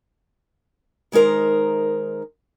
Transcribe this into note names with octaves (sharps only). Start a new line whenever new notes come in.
D#3 G#3 D#4 A#4 C5